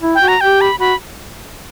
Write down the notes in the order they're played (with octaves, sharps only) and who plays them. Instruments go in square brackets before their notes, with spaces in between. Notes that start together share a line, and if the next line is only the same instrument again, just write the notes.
[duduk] E4
[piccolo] G5
[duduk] F#4
[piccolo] A#5
[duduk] G4 [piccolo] G5
[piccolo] B5
[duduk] F#4 [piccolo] B5